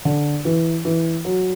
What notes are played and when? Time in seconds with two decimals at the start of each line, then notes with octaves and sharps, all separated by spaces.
0.05 D3
0.45 E3
0.85 E3
1.25 F#3